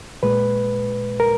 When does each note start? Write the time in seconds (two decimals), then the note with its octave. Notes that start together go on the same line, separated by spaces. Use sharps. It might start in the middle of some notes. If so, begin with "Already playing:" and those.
0.23 A#2 G#3 B4
1.20 A#4